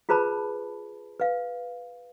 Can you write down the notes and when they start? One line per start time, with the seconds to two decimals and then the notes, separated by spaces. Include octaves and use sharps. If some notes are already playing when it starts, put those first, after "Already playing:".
0.09 F4 G#4 B4 C5 A5 B5
1.20 B4 F5